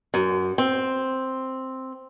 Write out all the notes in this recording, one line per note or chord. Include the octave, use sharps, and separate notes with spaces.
F#2
C4